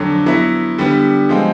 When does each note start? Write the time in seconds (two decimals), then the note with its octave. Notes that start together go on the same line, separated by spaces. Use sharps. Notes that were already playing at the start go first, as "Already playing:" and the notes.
Already playing: F2 D3 F#3
0.26 F#3 B3 E4
0.78 D3 G3 B3
1.29 F3 G#3 C4